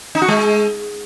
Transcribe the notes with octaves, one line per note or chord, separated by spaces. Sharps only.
D#4
F#4
G#3